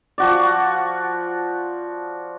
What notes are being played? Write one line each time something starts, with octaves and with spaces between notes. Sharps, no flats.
F3 F#4 D5